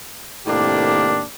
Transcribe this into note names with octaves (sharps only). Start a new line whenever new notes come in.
A2 C3 D#3 A#3 D4 G4